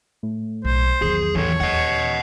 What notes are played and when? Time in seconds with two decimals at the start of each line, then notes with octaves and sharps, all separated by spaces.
0.23 A2
0.65 B1 C5
1.02 E2 D#3 F#3 G#4
1.36 D#3 E3 F#3 A4 C#5
1.60 D#2 E3 D#5 F#5